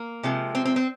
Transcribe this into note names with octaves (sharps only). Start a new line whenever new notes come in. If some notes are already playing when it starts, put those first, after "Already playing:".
Already playing: A#3
C3 F3 G#3
C4
C4
C4